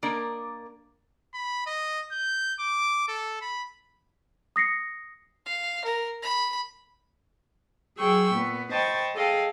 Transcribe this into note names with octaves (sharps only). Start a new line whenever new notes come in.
A#3 D4 A#4 D5 D#5
B5
D#5
G6
D6
A4
B5
D#6 A#6 C7 C#7
F5
A#4
B5
F#3 G#4 G5 C#6 E6
A#2 B3
C5 D#5 G5 A5 B5 C#6
G#4 A4 D#5 F5 G5